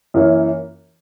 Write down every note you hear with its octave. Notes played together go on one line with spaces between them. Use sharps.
F#2 E3 A#3 C#4